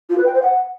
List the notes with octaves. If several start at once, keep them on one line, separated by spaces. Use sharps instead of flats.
F4
B4
G5
C5
F#5